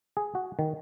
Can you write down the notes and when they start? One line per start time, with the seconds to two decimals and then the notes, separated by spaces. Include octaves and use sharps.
0.17 G#4
0.35 F#4
0.59 D#3